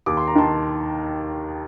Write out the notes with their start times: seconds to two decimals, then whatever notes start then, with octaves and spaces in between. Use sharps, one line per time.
0.06 D#2 D6
0.17 C6
0.28 A#5
0.36 D#3 A5 C6